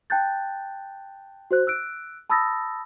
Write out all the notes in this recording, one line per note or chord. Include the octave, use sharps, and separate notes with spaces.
G5 A5 F#6 G6 A6
F#4 C5 F#6
E6 F#6 D7
A5 B5 D#6 E6 A6 A#6